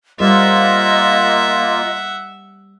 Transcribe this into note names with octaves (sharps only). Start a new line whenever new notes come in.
G3 A#3 F4 C5 D#5 E5 F#5